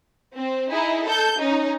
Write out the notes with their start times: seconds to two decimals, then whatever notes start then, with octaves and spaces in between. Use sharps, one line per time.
0.35 C4
0.71 D#4 E4 G#4
1.06 A4 G6
1.39 C#4 D#4